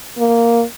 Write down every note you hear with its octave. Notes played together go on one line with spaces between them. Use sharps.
A#3